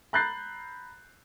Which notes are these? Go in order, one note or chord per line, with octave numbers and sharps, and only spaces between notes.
A#5 B5 F#6 G6 A6 C7